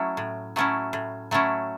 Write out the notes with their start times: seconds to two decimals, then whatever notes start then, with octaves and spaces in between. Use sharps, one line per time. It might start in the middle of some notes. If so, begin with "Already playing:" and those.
Already playing: F#3 A3 C#4 E4
0.17 A2
0.56 F#3 A3 C#4 E4
0.93 A2
1.31 F#3 A3 C#4 E4